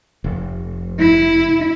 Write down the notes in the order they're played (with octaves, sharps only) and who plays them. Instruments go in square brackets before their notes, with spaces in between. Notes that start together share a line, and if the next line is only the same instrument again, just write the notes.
[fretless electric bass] F1
[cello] E4